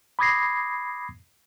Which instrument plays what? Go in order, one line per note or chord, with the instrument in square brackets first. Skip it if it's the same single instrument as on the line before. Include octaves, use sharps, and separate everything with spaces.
[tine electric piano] B5 D6 D#6 G#6 A#6 C7